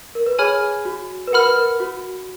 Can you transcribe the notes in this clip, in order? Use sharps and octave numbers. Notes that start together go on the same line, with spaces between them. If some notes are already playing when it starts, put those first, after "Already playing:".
A#4
B4
G#4 C#5 G#5 B5 F6
F#4
B4
A#4 F#5 B5 F6
B4
A#4
F#4